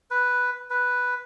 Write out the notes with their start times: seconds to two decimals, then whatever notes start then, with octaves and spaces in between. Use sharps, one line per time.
0.11 B4
0.70 B4